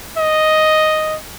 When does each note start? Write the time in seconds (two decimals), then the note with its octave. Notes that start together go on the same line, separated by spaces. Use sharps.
0.17 D#5